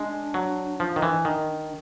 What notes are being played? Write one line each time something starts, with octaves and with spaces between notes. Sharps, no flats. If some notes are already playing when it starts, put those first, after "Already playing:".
Already playing: G#3 D4
F#3
F3 D4
D#3
E3
D#3